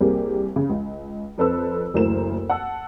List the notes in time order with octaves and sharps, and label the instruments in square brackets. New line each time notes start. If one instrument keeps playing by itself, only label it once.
[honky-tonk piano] C2 A#3 C4 G4 G#4
C#3
C#2
F2 C4 A4 B4 C5 E6
F#1 D2 E3 A#4 C5 E7
F#5 A5 E6